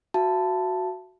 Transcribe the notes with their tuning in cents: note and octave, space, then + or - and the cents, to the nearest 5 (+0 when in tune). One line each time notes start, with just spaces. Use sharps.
F#4 +0 E5 +40 A5 +0